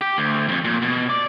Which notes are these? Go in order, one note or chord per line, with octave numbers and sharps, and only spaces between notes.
G4
D2
F2 G#2
A#2
B2
D5